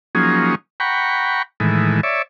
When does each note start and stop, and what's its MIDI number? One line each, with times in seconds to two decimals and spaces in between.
0.15 0.55 53
0.15 0.55 54
0.15 0.55 58
0.15 0.55 61
0.15 0.55 63
0.15 0.55 68
0.80 1.42 78
0.80 1.42 79
0.80 1.42 82
0.80 1.42 83
0.80 1.42 85
1.60 2.01 45
1.60 2.01 51
1.60 2.01 52
1.60 2.01 56
2.03 2.22 73
2.03 2.22 74
2.03 2.22 76